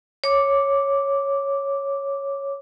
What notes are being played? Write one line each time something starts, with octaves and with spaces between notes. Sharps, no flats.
C#5 D6